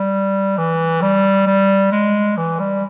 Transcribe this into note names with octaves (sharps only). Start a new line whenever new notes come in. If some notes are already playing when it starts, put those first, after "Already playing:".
Already playing: G3
E3
G3
G3
G#3
E3
G3